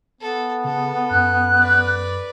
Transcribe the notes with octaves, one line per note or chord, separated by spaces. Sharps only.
B3 A4
C#3 A4
F#2 F#6
B4 D5